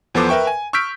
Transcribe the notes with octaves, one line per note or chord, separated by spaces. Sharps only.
E2 F3 B3 A4 C5 D6
A#4 B4 E5 G5 C#6
G#5
C#6 E6 F6 G6 B6 D7